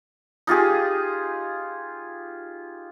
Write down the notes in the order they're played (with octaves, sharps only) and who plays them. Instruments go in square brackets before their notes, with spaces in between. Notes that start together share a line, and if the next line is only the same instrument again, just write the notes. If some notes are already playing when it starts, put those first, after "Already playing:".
[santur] D#4 F4 G4 G#4